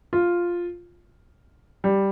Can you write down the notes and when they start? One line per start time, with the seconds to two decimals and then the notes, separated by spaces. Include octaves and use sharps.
0.13 F4
1.84 G3